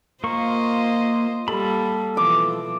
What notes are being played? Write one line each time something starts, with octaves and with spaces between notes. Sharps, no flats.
A#3 F4 C5 D#5 C#6
G3 A#3 A4 B5
B2 E3 F3 D6